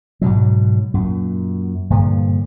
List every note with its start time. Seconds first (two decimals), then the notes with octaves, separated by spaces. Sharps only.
0.21 G#2 B2 F#3
0.94 F#2 A#2
1.90 G2 A#2 D3 F3